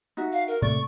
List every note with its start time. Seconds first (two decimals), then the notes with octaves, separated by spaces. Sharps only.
0.17 D#4 F#4 E5
0.33 F5
0.48 A#4
0.62 A2 C3 A3 D5 C#6